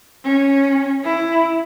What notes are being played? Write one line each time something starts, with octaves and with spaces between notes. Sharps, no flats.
C#4
E4